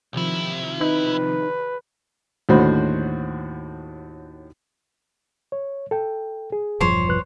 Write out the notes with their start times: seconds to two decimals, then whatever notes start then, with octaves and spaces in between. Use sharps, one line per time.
0.13 B1 C3 D#3 F3 E4
0.81 D#4 B4
2.49 D#2 A2 D3 F#4 C5 B5
5.52 C#5
5.91 A4 G5
6.52 G#4
6.80 E1 G2 F3 C5 C#5
7.08 C2 B4 F#6